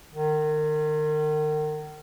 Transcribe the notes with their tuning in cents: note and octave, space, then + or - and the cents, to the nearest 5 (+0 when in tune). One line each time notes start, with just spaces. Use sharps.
D#3 -35